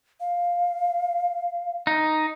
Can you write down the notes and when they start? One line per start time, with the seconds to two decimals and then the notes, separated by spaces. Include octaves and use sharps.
0.20 F5
1.87 D#4